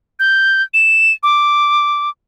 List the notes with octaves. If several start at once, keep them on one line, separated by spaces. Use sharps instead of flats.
G6
E7
D6